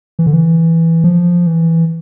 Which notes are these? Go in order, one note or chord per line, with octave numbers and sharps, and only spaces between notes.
E3
D3
E3
F3
E3